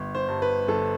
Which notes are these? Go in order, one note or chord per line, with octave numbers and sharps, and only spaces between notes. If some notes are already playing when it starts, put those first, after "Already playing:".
Already playing: G1
C5
G2
B4
G1 A4